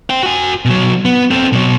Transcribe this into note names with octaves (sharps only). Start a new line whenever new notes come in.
C5 G5
F#4 G#5
B2 F#3
B3
C4 A4
B2 F#3